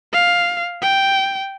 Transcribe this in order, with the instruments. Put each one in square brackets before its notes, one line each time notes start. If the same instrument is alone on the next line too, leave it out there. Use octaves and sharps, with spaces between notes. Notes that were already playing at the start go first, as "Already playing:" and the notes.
[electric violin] F5
G5